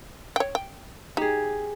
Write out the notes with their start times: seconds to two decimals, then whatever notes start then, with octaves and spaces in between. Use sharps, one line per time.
0.36 C#5 G5
0.55 G5
1.17 D#4 G4 G#4